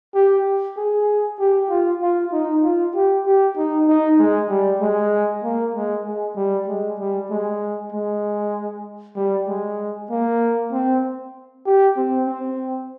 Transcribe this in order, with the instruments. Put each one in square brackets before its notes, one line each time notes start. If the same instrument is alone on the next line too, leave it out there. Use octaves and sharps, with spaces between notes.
[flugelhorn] G4
G#4
G4
F4
F4
D#4
F4
G4
G4
D#4
D#4
G#3
G3
G#3
A#3
G#3
G#3
G3
G#3
G3
G#3
G#3
G3
G#3
A#3
C4
G4
C4
C4